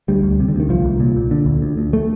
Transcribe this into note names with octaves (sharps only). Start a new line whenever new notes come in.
D2 G3
D2
C3
D3
D2 D#3
C2 F3
C2
A#2
A#2
D3
D2
D2
D2
A3